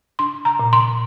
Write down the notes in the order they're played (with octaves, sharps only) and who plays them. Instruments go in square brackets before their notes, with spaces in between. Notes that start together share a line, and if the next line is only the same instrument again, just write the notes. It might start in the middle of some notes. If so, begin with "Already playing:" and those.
[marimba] D4 C6
A#5
A#2
C6